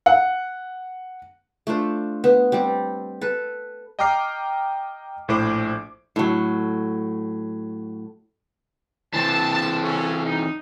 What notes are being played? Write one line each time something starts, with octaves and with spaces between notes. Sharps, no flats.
F#5
A3 D4 F4 C5
B3
G3 C4
A4 B4
D#5 G5 A#5 D6 F6 C7
A#1 A2 E4 C5 D6
A2 F#3
E3 C4 A5
A5
C#3 C#4 A4
D#4